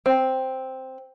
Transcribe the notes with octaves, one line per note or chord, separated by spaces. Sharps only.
C4